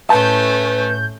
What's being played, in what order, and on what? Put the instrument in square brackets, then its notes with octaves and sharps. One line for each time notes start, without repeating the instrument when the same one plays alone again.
[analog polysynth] A2 G6 [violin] A3 C#4 [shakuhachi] B4 [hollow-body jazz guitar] A5